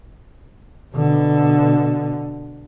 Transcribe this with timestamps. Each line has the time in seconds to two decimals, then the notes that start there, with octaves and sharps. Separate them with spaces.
0.95 B2 D3